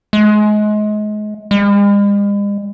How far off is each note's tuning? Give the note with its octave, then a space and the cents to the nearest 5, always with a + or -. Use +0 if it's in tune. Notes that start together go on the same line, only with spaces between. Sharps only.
G#3 +30
G#3 -45